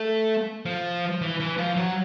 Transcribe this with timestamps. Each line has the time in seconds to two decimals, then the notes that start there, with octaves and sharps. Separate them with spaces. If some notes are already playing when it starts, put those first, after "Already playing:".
Already playing: A3
0.65 F3
1.21 E3
1.40 E3
1.58 F3
1.77 F#3